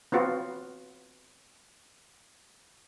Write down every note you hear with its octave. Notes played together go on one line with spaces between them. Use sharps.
B3 C4 F4 F#4